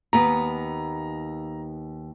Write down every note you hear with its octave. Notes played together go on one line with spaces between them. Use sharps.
D#2 B3 A#5